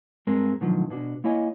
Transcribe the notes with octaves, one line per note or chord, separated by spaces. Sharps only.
G2 G#3 C4 G#4 A#4
B2 D3 D#3 F3 F#3
B2 D4 F#4
A#3 E4 C#5 D#5 G#5